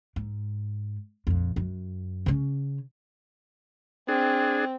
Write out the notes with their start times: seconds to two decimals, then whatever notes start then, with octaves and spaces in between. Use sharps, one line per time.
0.16 G#2
1.27 A#1 F2
1.56 F#2
2.26 C#3 C#4
4.08 C4 D4 G#4